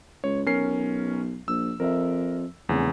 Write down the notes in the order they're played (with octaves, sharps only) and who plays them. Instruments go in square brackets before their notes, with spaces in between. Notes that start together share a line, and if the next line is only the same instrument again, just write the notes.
[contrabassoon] C#2 [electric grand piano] C#5
[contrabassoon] B1 [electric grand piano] C#4 A#4 C7
[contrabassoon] A#1 [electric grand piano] E6
[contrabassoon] F2 [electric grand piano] A#4 E5
[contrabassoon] F1 [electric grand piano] E2 C#3